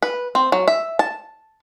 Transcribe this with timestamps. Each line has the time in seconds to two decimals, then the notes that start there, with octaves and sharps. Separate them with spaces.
0.03 B4
0.35 C4
0.52 F#3
0.68 E5
0.99 A5